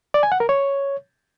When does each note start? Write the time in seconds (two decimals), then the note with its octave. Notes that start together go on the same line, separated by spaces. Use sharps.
0.14 D5
0.23 G#5
0.32 F#5
0.40 A#4
0.49 C#5